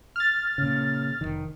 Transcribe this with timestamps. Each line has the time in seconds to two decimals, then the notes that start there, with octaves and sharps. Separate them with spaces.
0.16 F6 A6
0.58 A#2 C#3
1.21 F1 A#1 D#3